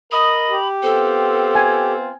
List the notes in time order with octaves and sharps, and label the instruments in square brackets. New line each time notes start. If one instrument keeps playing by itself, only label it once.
[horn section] A#4 D#5 [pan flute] B5
[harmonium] G4
[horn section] B3 C4 F4 [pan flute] A4
[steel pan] G#5